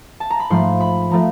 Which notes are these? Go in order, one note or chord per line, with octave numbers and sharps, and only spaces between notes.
A5
A#5
B5
G#2 F3 A3 C6
B5
F3 A3 A#5